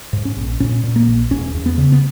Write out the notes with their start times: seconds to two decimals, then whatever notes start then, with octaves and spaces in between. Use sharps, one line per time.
0.13 G#2
0.25 C#4
0.37 A#1
0.60 A#2 C#4
0.84 A#2
0.96 A#3
1.08 A#1
1.30 E1 C#4
1.54 E2
1.66 B3
1.78 C#3
1.92 B3